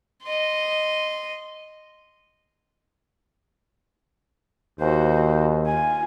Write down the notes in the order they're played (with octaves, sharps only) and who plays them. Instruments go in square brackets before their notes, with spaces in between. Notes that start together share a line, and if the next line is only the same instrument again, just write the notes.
[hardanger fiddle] D#5 C6
[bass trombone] D#2 [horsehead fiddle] F#4 C5
[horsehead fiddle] F4 G#5